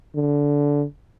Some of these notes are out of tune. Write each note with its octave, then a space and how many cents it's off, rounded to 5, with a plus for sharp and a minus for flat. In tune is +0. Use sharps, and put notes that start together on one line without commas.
D3 -15